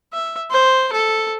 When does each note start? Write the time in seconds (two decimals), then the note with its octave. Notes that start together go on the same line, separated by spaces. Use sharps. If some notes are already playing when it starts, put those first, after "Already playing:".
0.13 E5
0.51 C5
0.92 A4